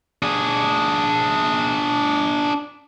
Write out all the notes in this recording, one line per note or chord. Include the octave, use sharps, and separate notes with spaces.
D4 G#4